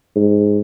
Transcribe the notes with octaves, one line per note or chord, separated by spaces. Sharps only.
G#2